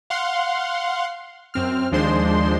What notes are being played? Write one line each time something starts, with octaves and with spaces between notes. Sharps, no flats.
F5 F#5 C6
F#2 C4 F6
D#2 F3 G#3 D4 C5 C6